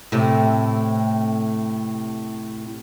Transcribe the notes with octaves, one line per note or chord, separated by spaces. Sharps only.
A2 C3